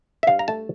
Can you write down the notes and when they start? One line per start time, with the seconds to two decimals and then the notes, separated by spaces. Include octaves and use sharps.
0.23 E5
0.27 G2 F5
0.39 A#5
0.48 A3 A5